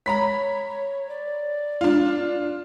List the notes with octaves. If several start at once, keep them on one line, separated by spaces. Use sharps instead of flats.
C#5 A#5 B5 B6
D5
D4 F4